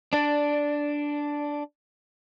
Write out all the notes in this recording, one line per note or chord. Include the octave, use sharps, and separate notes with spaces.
D4 D5